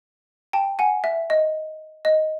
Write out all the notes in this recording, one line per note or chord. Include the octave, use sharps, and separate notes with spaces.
G5 A5
F#5 G#5
E5
D#5
D#5